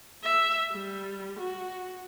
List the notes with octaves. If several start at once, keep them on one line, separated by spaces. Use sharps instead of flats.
E5
G3
F#4